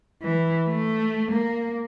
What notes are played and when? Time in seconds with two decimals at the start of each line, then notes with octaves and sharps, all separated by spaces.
0.23 E3
0.68 A3
1.31 A#3